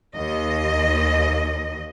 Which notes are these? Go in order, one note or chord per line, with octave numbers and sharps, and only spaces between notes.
D#2 D#5